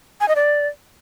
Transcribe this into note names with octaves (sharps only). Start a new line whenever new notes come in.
G#5
D#5
D5